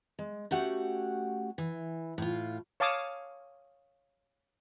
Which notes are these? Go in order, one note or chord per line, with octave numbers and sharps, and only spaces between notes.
G#3
A3 C#4 F#4 G4 F#5
E3
A2 F4
C#5 F5 A5 D6 D#6